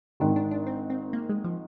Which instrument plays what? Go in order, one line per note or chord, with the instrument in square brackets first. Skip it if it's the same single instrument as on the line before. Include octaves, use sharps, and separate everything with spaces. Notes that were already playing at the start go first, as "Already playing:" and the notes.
[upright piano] G#1 G#2 D#3 [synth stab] D4
[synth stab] D4
D4
C4
C4
A#3
G#3
F3